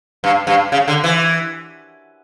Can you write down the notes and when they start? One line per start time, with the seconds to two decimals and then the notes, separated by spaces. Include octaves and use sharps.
0.24 G2
0.47 G2
0.72 C#3
0.88 D3
1.04 E3